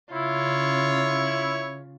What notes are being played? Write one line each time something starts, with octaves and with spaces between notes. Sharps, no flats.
C#3 E4 F4 C#5